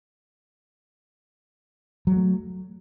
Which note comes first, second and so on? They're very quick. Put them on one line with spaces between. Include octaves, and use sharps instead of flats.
F#3 G3 A3